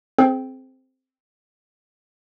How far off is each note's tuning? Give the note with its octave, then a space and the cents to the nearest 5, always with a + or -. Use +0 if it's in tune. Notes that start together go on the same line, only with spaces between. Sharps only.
C4 +0 G#4 +40 G5 +0